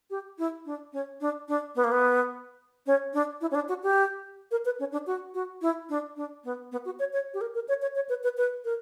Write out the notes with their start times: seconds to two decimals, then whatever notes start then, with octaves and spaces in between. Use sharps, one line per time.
0.10 G4
0.38 E4
0.66 D4
0.93 C#4
1.21 D4
1.48 D4
1.75 B3
1.84 A#3
1.92 B3
2.86 C#4
3.14 D4
3.41 E4
3.51 C#4
3.55 D4
3.69 F#4
3.83 G4
4.51 A#4
4.65 B4
4.79 C#4
4.92 D4
5.07 F#4
5.34 F#4
5.62 E4
5.89 D4
6.16 D4
6.44 B3
6.72 B3
6.85 F#4
6.99 C#5
7.13 C#5
7.34 G4
7.41 A#4
7.55 A#4
7.68 C#5
7.82 C#5
7.95 C#5
8.09 B4
8.23 B4
8.37 B4
8.65 A#4